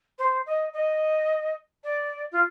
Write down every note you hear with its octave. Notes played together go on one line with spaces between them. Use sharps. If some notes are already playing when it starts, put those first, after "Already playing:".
C5
D#5
D#5
D5
F4